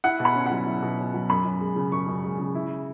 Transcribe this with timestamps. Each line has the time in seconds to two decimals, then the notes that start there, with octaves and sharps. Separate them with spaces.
0.04 E4 F#5
0.20 B2
0.25 B5
0.36 C#4
0.46 F#3 F#5
0.67 E4
0.82 B2
0.98 C#4
1.14 F#3
1.30 F#2 B5
1.45 F#2
1.61 G#3
1.76 C#3
1.92 F#2 C#6
2.08 F#2
2.24 G#3
2.39 C#3
2.55 E4